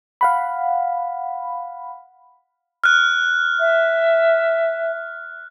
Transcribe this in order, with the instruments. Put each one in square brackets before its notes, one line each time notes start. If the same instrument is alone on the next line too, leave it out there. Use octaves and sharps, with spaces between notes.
[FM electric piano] F5 F#5 B5
[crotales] F6 F#6
[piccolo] E5